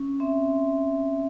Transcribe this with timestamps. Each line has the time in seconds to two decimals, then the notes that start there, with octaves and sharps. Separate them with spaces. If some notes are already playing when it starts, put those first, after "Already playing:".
Already playing: C#4
0.20 C4 E5